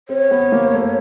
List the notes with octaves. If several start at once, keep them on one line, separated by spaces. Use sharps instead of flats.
C4 C#5
B3
A#3
A3